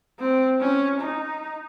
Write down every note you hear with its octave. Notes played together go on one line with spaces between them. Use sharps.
C4
C#4
D#4